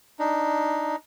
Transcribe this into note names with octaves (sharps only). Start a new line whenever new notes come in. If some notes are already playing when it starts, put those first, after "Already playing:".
D4 D#4